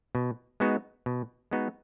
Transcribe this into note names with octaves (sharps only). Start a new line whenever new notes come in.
B2
G#3 B3 D#4 F#4
B2
G#3 B3 D#4 F#4